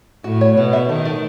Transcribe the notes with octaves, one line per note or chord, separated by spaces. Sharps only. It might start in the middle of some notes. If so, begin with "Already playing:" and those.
A2 F#4
C#5
B2 F#4
E5
D#3 A3
A3